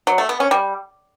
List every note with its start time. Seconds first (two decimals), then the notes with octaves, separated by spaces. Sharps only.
0.07 F#3
0.18 A3
0.29 B3
0.40 C#4
0.51 G3